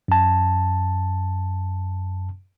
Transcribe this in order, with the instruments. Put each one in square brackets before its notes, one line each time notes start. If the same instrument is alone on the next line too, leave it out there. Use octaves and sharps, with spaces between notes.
[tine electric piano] F#2 A5